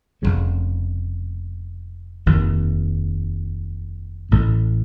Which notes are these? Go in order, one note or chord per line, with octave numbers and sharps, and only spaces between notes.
F1 F2 C#3 A3
F1 D#2 D#3
A1 A2 A3